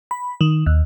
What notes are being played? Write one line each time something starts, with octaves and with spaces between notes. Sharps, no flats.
B5
D#3
D#2